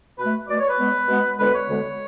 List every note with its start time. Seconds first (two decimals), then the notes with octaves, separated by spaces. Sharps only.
0.18 B2 A3 B4
0.48 B2 A3 D5
0.59 C#5
0.69 B4
0.78 B2 G#3 B3
1.08 B2 G#3 B3
1.38 D2 D3 G#3 B3 B4
1.54 C#5
1.69 D2 D3 G#3 B3